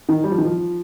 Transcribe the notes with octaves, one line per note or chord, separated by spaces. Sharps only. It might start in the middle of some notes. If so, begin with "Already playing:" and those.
D#3
G3
F3
D#3
F3